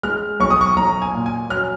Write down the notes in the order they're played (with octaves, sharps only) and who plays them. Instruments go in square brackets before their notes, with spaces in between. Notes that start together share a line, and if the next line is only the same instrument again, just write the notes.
[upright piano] G#3 F6
B1 C#6
D#6
C#6
B1 A#5
G#5
A#2
G#5
F#3 F6